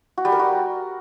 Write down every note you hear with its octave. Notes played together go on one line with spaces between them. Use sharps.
F#4
G3
A#4
F#4